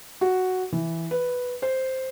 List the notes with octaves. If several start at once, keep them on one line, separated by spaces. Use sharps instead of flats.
F#4
E3
B4
C5